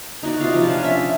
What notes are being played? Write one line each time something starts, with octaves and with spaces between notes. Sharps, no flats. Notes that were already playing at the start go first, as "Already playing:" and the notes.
D#4 F#4 D5
C3 F4 F5
F3
C#4 D4
E5